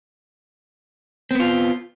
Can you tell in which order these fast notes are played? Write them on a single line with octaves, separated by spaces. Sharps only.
C4 B3 F4